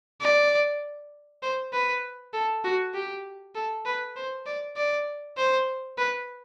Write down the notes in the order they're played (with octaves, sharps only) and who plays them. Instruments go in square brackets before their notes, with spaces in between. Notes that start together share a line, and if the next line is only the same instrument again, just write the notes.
[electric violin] D5
C5
B4
A4
F#4
G4
A4
B4
C5
D5
D5
C5
B4